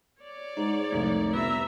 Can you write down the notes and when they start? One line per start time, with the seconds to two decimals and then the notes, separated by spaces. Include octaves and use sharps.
0.22 C#5 D5
0.57 G#2 D#4
0.92 C2 F2 D#3 A3
1.34 G1 B4 E5 A#5